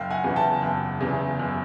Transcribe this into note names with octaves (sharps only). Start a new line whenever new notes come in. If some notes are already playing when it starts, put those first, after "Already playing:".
Already playing: F#1 F5 G5
F#5 G#5
E2 C#3 E3
G5 A5
F#1
E2 C#3 E3
F#1